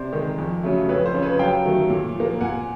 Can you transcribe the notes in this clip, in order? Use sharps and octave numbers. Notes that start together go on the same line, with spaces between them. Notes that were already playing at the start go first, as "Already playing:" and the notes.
Already playing: C3 C5 D5
D#3 G#3
F2
C#3 F#3 A3
F2 B4 C#5
C5
C#3 F3
B4 C#5
F#2 F5 G5
D#3 F#3 A3
A#2
F3 A#3
A#2 F#5 G#5